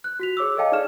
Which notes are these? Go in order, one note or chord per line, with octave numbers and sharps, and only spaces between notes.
F#6
F#4 B6 F7
G#4 C#5 D6 E6
A4 C#5 D#5 F5 G5 A5
D#4 G#4 D5 F6 E7